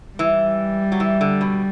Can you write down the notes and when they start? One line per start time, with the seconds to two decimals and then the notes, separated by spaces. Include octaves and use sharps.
0.19 E3 G3
0.92 F#3
1.00 E3
1.21 D3
1.41 B2